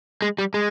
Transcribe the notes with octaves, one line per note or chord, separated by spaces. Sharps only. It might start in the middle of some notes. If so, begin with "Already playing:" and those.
G#3
G3
G#3